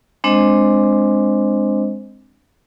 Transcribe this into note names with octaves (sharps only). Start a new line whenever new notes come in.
G#3 C4 D4 C5 D#5